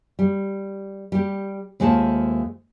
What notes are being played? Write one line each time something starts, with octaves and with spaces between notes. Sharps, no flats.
G3
G3 G4
D#2 G#3 A3 F4 C5 A5